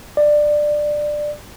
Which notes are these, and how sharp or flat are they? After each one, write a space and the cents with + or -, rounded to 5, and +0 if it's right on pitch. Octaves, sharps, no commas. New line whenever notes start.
D5 +15